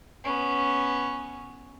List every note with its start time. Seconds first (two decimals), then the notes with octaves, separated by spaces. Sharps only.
0.24 B3 C#4